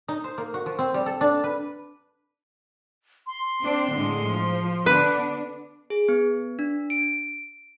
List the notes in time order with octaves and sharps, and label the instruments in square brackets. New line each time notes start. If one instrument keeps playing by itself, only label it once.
[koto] D#4
C5
A#3
F#4
F3
C4
G3
A4
D4
B4
[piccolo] C6
[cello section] C4 D4
A2 D3 G#3
F3
[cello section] D3 B3 D4 [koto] B4
[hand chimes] G#4
B3
D4
D7